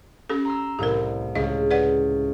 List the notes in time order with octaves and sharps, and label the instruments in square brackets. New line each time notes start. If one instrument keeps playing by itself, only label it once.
[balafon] C#4 G4 A4
[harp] A#5 C6 E6
[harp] C2 A2 [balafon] G4 A#4
[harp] C#2 [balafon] D#5 F5
[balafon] B4 D5 F#5